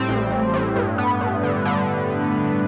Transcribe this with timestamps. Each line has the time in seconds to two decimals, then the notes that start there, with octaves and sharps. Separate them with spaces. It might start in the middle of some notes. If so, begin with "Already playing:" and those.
Already playing: A2 G3 C4
0.09 A1
0.31 A1
0.54 A2
0.76 G2
0.98 B3
1.21 G2
1.43 D3
1.65 D3